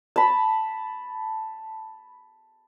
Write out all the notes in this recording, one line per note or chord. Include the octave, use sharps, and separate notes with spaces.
A5 B5